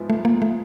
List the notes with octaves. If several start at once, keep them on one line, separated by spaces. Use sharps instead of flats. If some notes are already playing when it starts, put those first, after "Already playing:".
Already playing: G#2 F3 G#3 B3 E4
A3
A#3
A3